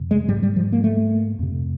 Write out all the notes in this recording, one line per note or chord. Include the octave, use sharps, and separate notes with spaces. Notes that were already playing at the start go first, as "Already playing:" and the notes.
Already playing: F2 C3
G#3
G#2 G3
G3
F3
A#3
A3
F2 C3